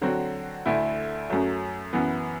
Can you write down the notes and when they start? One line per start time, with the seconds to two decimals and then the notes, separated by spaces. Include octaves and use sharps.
0.01 D3 F#3 C4 F#4
0.66 D2 D3 A3 E4
1.30 F#2 F#3 A3
1.93 F#2 E3 B3